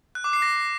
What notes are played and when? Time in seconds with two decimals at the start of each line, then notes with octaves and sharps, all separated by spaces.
0.15 F#6
0.24 D6
0.33 C7
0.42 A#6